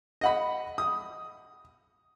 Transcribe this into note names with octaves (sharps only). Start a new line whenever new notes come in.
D#5 F#5 B5
D#6